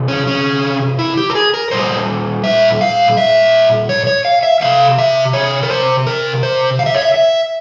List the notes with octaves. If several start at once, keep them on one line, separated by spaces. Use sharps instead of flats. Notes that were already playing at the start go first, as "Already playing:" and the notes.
Already playing: C3 E3
C#4
C#4
E4
G4
A#4
G#4
A#4
A#2 G3 C5
E5
F5
E5
C#5
C#5
F5
E5
C3 G3 F5
E5
C#5
A#4
C5
A#4
C5
F5
E5
C#5
E5
E5